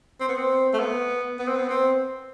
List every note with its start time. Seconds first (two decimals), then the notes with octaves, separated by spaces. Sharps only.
0.20 C4
0.29 B3
0.38 C4
0.73 A3
0.80 B3
1.39 B3
1.47 C4
1.56 B3
1.70 C4